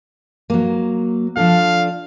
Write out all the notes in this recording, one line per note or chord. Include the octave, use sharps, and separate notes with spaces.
F#3 A#3
F3 D4 A4 F5